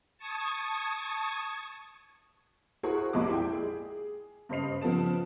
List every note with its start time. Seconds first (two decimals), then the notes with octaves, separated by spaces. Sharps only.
0.18 A5 C#6 D#6 G#6
2.83 E4 F#4 G#4 A#4 C5 C#6
3.13 A#1 F2 C3 G#3 D6
3.29 E4 G5
3.53 G#4
4.49 G2 C#3 C5 D#5 C7 F7
4.81 C#3 F3 B3 A4 A5 E7